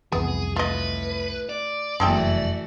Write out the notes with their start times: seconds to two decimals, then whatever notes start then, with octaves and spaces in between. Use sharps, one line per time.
0.12 C2 F2 E3 B3 G#4
0.56 A2 F4 B4 D#5
1.49 D5
2.00 F1 F#2 E3 G#3 A3 F#4 A4 G5